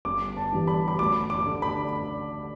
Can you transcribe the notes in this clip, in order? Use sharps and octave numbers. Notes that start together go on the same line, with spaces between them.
G1 D6
A5
G2 E3 G3
B5
B5
D2 D6
D6
D3 A3
B5